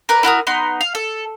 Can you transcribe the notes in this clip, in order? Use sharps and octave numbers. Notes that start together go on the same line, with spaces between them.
A#4 B4 D5
E4 F#4 A#4 D#6
B3 D#4 C6
F5
A4